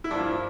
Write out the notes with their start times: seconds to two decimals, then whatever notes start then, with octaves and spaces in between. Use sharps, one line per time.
0.04 E4
0.11 G2 F3 A#3 D4